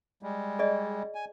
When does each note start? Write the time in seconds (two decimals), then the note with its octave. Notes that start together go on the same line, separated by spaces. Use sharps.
0.23 G3 G#3
0.59 G#4 D5 D#5
1.15 G#5